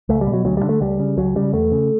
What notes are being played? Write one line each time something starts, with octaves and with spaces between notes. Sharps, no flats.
C#2 A3
G3
B2
F#3
D2 F#3
G3
D3
A3
C#2 G3
C#3
C#2 F#3
C#3 G3
E2 A3
C#3